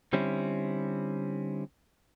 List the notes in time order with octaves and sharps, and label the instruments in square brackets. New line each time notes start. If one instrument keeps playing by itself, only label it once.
[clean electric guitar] D3 G3 C4 C#4 E4